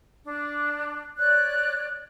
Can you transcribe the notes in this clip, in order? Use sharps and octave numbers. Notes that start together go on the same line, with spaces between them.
D4
C#5 D5 F#6